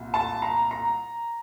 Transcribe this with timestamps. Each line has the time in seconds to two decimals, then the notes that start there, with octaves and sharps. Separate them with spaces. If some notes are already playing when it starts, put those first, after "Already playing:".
Already playing: C2 A#2
0.14 A5
0.42 A#5
0.71 A#5